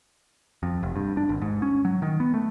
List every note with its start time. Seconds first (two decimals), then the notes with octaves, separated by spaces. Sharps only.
0.63 F2
0.83 F1
0.96 G2
1.17 D4
1.29 G#1
1.42 G#2
1.62 C#4
1.85 F#3
2.02 D#3
2.20 B3
2.34 A3